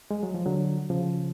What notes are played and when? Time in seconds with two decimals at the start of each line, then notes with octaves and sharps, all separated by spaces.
0.11 G#3
0.23 F#3
0.34 F3
0.46 D3 F#3
0.90 C#3 F3